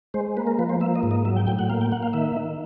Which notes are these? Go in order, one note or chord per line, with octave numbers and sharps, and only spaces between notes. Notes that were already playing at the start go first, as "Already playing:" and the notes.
G#3 C5
A#3 B4
A#4
F3 B4
C5
A#3 E5
D#5
G#2
D#5
F#3 E5
G5
A2 G5
F#5
A#3 F5
G5
A#3 F#5
F5
D#3 E5
D#3